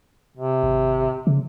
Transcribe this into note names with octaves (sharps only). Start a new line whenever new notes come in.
C3
G#1
C#3